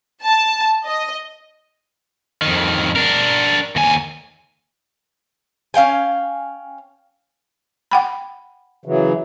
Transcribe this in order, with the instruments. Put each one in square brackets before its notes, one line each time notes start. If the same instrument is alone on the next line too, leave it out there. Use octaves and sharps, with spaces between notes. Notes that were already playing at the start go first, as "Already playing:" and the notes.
[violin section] A5
D#5
[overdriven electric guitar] F2 D#3
D4 A#4
D#2 G#5
[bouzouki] C#4 F5 G5 G#5
[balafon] F#5 G5 B5
[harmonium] C#3 E3 F#3